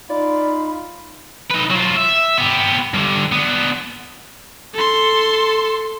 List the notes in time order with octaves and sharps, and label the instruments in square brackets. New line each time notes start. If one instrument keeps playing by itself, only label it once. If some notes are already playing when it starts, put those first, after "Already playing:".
[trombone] D#4 [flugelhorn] F4 [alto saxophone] D5 [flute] B5
[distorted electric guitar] D#4 B4
F#3 F4
E5
B3 G4
G2 D3
B3 D4
[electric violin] A4 C6